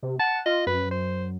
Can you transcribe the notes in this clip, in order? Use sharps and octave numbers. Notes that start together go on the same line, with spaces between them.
C3
F#5 A5
F4 D#5
F#2 B4
C5